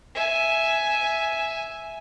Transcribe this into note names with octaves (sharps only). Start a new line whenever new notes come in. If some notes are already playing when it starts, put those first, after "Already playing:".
E5 G#5